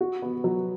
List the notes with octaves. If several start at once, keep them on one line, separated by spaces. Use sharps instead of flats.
F#4
B3
F#3